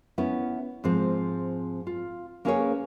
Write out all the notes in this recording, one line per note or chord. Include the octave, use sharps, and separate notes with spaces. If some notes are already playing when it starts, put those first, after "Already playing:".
B3 C#4 E4
G#2 F3 C4
F4
A#3 C#4 E4 G#4 B4 C#5